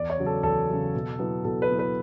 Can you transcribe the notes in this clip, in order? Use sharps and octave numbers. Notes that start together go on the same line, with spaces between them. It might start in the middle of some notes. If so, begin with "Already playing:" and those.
Already playing: E2 D5
C#5
C#3 F#3
A4
E2 A4
C#3 F#3
B2
F#3 B3 E4
B2 A4
B4
F#3 B3 E4
B4